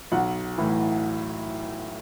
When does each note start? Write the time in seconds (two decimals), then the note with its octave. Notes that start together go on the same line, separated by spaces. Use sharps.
0.12 B1 F#5
0.58 A2 E3